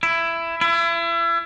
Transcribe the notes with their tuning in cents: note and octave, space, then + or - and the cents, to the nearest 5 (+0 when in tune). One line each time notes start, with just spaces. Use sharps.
E4 +15
E4 +35